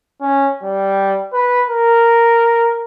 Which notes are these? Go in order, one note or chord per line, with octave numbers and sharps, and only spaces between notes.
C#4
G3
B4
A#4